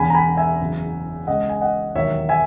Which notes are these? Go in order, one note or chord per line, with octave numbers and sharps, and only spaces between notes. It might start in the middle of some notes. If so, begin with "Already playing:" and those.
Already playing: E1 E2 C#3 G#5 B5
A#5
G#5 B5
E5 G#5
F#1 E2 C#3 F#3
C#2 C#3 G#3 D#5 F#5
G#5
D#5 F#5
E1 D#2 D#3 F#3 C#5 E5
E5 G#5